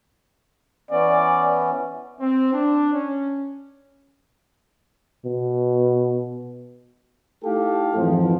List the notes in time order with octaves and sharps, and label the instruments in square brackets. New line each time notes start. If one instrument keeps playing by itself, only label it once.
[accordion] E3 B3 C#4 [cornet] D5
[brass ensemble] C4
D4
C#4
[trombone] B2
[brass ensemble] A3 D#4 E4 G4 A4 F5
F2 G#2 E3 F3